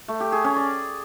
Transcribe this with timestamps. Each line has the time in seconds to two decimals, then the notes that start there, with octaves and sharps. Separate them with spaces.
0.08 A3
0.20 G4
0.32 G#4
0.44 C#4
0.56 D5